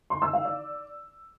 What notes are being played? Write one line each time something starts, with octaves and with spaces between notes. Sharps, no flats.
C6
E6
F5
D5